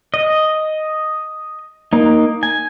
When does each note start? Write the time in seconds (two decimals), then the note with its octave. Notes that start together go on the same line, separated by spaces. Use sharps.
0.14 D#5
1.93 A#3 D#4
2.43 G#5